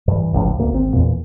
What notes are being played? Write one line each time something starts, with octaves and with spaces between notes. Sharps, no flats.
G2 E3
G1 C#2 A2 F3
D2 A#3
G#1 C4
E2 A#2